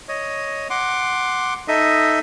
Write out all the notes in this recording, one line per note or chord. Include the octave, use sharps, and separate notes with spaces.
C#5 D#5
F#5 C6 D6
D#4 A4 D#5 E5